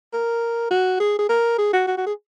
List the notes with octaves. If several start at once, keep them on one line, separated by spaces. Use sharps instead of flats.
A#4
F#4
G#4
G#4
A#4
G#4
F#4
F#4
F#4
G#4